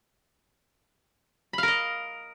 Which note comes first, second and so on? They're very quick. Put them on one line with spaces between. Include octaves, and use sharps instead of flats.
B5 F5 A#4 D#5